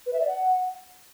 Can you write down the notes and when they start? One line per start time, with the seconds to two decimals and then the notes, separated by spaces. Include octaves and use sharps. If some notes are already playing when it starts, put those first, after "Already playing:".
0.06 B4
0.13 E5
0.20 D5
0.27 F#5